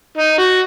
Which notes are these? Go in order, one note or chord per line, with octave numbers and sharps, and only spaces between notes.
D#4
F#4